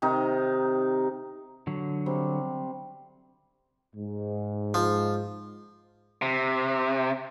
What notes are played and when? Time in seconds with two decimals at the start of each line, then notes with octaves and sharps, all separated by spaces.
0.02 C3 D#3 D#4
1.67 D3 F#3
2.06 C3 G3
3.95 G#2
4.74 F3
6.22 C3